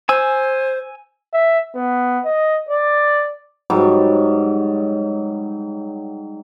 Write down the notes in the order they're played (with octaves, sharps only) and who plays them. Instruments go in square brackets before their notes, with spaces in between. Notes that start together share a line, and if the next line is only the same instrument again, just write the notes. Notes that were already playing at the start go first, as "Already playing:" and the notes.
[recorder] C5 [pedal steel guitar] G#5 E6
[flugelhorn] E5
B3
D#5
D5
[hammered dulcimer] G#2 F#3 G3